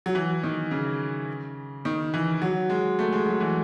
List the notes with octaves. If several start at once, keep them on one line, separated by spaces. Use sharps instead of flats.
F#3
E3
D#3
C#3
D#3
E3
F#3
G#3
A3
G#3
F#3
E3